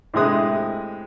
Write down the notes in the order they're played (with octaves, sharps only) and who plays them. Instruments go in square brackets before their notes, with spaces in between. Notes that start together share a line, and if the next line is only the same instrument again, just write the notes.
[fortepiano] A2 C3 G#3 D#6 F#6